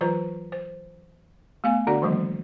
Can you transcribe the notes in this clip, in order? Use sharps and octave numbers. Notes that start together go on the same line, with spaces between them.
E3 F#3 F4 B4 C5 A#5
C5
A3 B3 F5 G#5
D3 D4 F#4 D5 F#5
D#3 E3 F#3 G#3 A#3